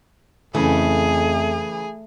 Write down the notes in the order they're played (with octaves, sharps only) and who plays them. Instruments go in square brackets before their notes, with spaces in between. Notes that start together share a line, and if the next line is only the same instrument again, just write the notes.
[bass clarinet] F2 [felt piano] C#3 E3 [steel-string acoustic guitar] A3 [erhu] G#4